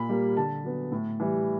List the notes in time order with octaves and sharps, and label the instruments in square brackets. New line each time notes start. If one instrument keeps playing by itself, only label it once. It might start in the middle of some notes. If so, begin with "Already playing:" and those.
Already playing: [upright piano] A#2 B5
G3 A#3
D3 A5
F#3 B3
A2
E3 G3